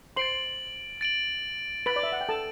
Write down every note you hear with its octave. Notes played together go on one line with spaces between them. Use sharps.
C5 C6 A6 D7 F#7
A6 D7 F#7
B4 B5 A6 D7 F#7
D5
E5
F#5
G5
A4 A5